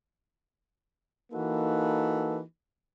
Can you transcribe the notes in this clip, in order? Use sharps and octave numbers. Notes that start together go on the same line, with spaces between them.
E3 A#3 D#4 F#4 A4 B4